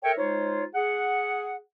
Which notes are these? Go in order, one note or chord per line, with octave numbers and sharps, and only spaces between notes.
A4 A#4 C#5 E5 G5
G#3 D#4 F4 C5 C#5
G#4 F#5